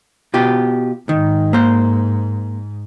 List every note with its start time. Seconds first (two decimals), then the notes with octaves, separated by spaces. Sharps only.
0.34 B2 F4 G4
1.09 G#2 D#3
1.53 A#3 C5